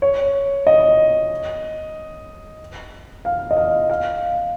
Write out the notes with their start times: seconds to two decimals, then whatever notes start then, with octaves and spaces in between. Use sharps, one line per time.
0.02 C#5
0.67 D#5
3.25 F5
3.51 D#5
3.57 F5
3.90 F5